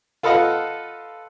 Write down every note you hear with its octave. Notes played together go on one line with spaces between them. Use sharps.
F4 A4 B4 D#5 F5 F#5